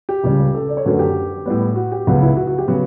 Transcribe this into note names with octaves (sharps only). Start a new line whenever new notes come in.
G4
C#2 C#3 G3
A4
D5
C#5
F#2 D3 F#3 A3 B4
G4
A2 G3 B3
F#4
G4
C#2 C#3 F#3 B3 F#4
E4
F#4
F#4
G4
C#3 F#3 B3 F#4